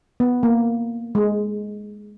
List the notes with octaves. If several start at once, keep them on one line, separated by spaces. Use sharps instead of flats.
B3
A#3
G#3